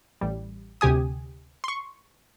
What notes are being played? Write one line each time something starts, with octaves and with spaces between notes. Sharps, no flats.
A1 G3
D2 C3 G4 G#5 D#6
C6 C#6